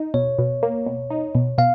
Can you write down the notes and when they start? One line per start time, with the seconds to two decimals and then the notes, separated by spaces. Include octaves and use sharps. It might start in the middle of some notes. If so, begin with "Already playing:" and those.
Already playing: D#4
0.14 B2 C#5
0.39 B2
0.63 A#3
0.86 B2
1.10 D#4
1.35 B2
1.58 B2 F5